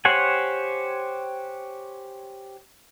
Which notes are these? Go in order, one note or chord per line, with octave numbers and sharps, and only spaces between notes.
G4 C5 C#5 F#5 G#5